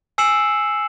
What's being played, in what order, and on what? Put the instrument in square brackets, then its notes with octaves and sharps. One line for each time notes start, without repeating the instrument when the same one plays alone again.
[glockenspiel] G#5 E6 C7 C#7 E7 F#7